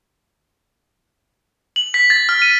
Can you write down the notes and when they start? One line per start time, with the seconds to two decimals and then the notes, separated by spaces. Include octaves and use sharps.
1.76 F#7
1.94 B6
2.10 A6
2.29 F6
2.42 D#7